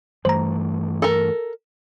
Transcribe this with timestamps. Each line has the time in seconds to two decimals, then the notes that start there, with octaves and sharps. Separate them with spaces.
0.25 G2 E3 A3 C5 A#5
1.02 A4 A#4